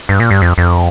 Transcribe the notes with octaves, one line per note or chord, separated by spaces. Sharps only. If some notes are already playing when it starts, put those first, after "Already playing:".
G2
A#2
G2
F2
F2